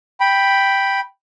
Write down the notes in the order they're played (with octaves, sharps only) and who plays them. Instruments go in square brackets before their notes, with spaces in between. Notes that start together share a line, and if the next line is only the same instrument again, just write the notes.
[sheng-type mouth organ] G5 B5